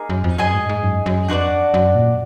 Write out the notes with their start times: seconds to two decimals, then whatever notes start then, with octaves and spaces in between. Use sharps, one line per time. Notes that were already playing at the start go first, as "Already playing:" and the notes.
Already playing: A#3 D#4 G#4
0.09 F#2
0.24 F2
0.38 F#2 G#4 D#5 G#5
0.54 G#2
0.69 G#2
0.83 F#2
1.06 F#2
1.28 F2 D4 F#4 B4 D5
1.74 F#2
1.95 A#2